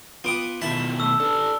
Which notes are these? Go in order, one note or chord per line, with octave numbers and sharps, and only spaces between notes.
B3 F4 B4 G5 D6 D#6
B2 D#3 E4 E5 A5
A3 E6
D4 A4 B4